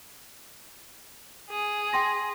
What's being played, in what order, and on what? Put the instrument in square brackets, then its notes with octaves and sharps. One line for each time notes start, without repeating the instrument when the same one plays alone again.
[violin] G#4
[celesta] G5 C6 A#6